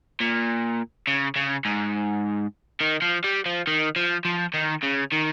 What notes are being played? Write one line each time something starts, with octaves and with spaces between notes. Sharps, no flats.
A#2
C#3
C#3
G#2
D#3
F3
G3
F3
D#3
F3
F3
D#3
C#3
D#3